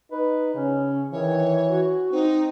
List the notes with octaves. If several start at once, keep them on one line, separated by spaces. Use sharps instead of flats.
D#4 B4
C#3 C#4
D#3 E3 C#5
F#4
C4 D#4